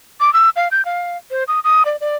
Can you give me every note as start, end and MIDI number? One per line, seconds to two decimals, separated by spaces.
0.20 0.33 86
0.34 0.50 88
0.56 0.68 77
0.71 0.84 91
0.85 1.17 77
1.31 1.44 72
1.48 1.60 87
1.64 1.83 87
1.85 1.96 74
2.01 2.17 74